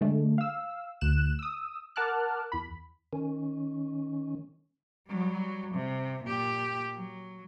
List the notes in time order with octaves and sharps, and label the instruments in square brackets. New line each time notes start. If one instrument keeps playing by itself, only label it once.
[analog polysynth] D3 G#3 A3 D4
F5 E6
D2 F#6 E7
D#6 E6
A#4 F#5 A5 D6 F6 F#6
E2 B5
[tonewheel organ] D#3 C#4
[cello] F#3 G3
C3
A#2 G4
F#3